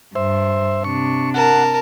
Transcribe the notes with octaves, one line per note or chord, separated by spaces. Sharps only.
G2 C5 E5
C3 D4 C#6
A#4 F#5 A5